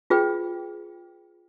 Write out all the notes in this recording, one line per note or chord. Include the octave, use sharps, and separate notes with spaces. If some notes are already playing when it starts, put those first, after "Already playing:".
F4 G#4 B4 G5